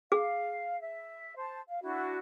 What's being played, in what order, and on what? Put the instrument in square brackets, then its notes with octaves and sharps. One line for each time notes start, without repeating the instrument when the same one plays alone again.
[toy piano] G#4 [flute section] F5
[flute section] E5
C5 A5
F5
D4 E4 F#4